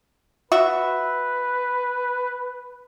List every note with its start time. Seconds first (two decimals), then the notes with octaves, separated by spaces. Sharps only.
0.52 F#4 B4 E5